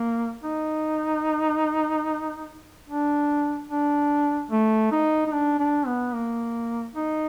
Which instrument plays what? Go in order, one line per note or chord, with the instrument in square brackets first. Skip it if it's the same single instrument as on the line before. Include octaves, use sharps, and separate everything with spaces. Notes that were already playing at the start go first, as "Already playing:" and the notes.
Already playing: [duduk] A#3
D#4
D4
D4
A3
D#4
D#4
D4
D4
B3
A#3
D#4